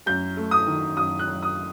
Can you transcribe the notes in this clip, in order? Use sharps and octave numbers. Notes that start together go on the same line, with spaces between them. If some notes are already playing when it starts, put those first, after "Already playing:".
F#2 G6
A3
D#6
D#3
F#2 D#6
F#6
F#2
D#6